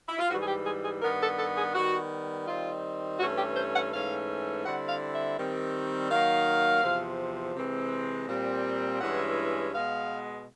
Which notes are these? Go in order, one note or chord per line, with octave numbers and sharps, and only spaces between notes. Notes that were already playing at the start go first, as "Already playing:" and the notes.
E4
F4
G#2 E3 G3 F#4
G#4
G4
G#4
G#4
G2 D#3 G3 B3 A#4
A4
A4
G#4
D#3 G3 B3 F#4
D#3 G3 C4 D#4 F4
G2 E3 A3 C#4 F#4
G4
C5
F#5
G#2 E3 A3 C#4 F5
D3 G3 C4 E4 F#5
F5
E5
D#3 G3 C4
D#3 F#3 A#3 D#4 F5
E2 C3 F3
C3 E3 G#3 C4
A#2 G3 C4
G2 E3 G#3 C#4 E4 F#5
B2 G#3 B3 F5